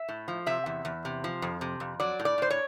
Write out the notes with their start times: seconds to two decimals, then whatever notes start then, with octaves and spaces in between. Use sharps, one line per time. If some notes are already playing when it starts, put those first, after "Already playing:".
Already playing: E5
0.09 A2
0.28 F3
0.46 C3 E5
0.66 E2
0.85 E2
1.05 C3
1.24 F3
1.42 F2
1.61 C3
1.80 F2
2.00 F#3 D5
2.19 A2
2.25 D5
2.38 A2 C5
2.50 C#5